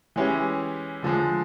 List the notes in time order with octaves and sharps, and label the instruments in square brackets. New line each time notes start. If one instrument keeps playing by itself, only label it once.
[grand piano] E3 G#3 C#4 E4 G4
D3 F3 G#3